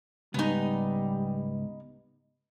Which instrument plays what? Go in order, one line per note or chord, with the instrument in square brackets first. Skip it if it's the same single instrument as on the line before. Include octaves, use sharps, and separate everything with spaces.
[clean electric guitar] C#2 G#2 G#5 [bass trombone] G3 [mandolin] B3 D#4